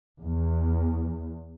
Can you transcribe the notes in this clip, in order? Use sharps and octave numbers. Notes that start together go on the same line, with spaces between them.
E2